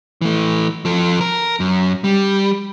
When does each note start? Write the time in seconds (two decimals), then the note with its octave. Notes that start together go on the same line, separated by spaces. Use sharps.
0.21 E3 A3
0.85 F3 A4
1.21 A#4
1.60 F#2
2.04 G3